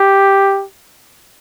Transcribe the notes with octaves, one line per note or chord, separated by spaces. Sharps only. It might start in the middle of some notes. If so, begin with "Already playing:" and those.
Already playing: G4